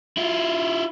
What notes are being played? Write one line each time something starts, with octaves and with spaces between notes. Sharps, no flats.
E4 F4